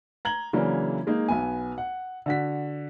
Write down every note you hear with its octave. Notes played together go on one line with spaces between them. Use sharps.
A#5 G#6 F#7 G7
C#3 E3 F#3 A#3 C#4 D4
G#3 A#3 D#4
B1 B3 G#5
F#5
D3 F#4 B6